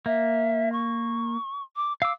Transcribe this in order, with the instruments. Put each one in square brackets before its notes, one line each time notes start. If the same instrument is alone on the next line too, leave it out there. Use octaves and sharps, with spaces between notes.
[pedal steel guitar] A#3 [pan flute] E5
[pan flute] C#6
D6
[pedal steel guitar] F5 D6 [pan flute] E6